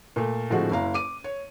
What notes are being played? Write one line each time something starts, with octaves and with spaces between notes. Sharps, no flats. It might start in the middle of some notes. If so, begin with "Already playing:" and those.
A#2 A3
A2 D3 F3 G#3 C4 F#4
F#1 E4 F5 A#5
D6 D#7
C#5